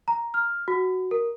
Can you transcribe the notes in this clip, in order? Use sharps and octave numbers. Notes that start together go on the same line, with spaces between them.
A#5
F6
F#4
A#4